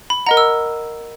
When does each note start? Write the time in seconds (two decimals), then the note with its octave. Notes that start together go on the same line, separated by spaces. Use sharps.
0.10 B5
0.27 A#4 D#5 F#5 A#5
0.37 E6